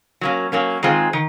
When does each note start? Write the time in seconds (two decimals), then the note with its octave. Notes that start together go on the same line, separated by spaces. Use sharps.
0.21 F#3 A#3 C#4
0.52 F#3 A#3 C#4
0.83 D#3 G#3 C4 F4 G#4
1.13 D#3